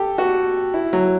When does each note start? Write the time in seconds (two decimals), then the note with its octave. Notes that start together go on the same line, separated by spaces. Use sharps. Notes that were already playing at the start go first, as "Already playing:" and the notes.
Already playing: G4 A4
0.18 F#4
0.74 E4
0.93 F#3